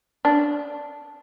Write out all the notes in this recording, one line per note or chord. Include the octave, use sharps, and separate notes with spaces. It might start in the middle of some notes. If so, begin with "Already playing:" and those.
D4